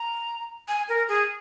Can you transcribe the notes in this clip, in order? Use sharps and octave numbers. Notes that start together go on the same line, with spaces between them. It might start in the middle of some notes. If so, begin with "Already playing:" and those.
Already playing: A#5
G#5
A#4
G#4